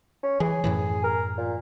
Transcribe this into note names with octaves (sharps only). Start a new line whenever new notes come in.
C#4
E3 G#4
F#2 A2 E3
A#4
A#2